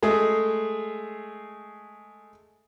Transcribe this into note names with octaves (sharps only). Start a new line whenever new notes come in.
G#3 A3 G#4